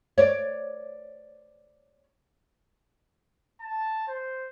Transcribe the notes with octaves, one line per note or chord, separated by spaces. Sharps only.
C#5 D5
A5
C5